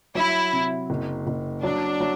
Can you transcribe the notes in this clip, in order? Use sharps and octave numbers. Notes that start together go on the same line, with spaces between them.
F#3 E4
C3
F#1
F#1
F#3 D4
F#3